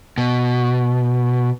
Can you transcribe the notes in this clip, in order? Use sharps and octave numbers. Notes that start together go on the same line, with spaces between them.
B2